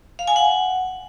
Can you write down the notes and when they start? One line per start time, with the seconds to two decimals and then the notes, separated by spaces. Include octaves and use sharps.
0.19 F5
0.27 G#5
0.36 F#5